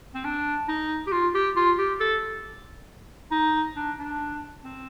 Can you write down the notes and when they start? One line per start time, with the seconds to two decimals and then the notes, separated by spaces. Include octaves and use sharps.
0.14 C4
0.24 D4
0.68 D#4
1.07 G4
1.12 F4
1.34 G4
1.56 F4
1.78 G4
2.00 A4
3.31 D#4
3.76 D4
3.98 D4
4.63 C4